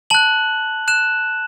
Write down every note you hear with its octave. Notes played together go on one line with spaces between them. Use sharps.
A5 F#6 F#7
F#6 E7